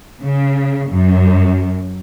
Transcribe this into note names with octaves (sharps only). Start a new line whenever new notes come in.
C#3
F#2